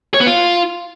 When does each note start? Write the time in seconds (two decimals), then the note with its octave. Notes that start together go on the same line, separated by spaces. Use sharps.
0.14 C#5
0.21 B3
0.27 F4